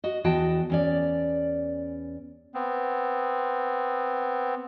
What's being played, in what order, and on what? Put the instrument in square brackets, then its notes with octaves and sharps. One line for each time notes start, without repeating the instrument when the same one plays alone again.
[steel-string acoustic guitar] F#4 D#5
E2 E3 F#4 D#5 G5 A5
E2 C#4 D5
[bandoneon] B3 C4